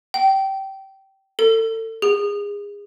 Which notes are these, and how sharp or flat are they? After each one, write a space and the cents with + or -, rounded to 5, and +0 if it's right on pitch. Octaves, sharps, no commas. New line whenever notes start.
G5 -20
A4 +30
G#4 -30